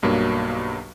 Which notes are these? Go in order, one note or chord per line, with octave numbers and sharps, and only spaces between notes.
B1 G2 F#3 A#3